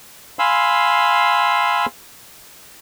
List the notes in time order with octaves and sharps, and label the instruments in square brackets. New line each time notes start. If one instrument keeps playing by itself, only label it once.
[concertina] F5 G#5 B5 C6 E6